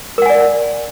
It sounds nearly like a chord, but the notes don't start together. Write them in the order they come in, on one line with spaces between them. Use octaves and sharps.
A#4 F#5 G#5 D5